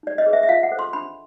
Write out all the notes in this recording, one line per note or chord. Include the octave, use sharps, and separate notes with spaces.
D#4 D5
D#5
G#4 B4
E5
E5
F4 F5
F#5
A4 C5
C6
D4 B5